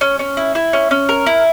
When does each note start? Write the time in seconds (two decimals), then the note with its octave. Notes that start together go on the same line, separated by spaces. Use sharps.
0.01 C#4
0.19 C#4
0.37 E4
0.55 E4
0.73 C#4
0.91 C#4
1.09 A#4
1.26 E4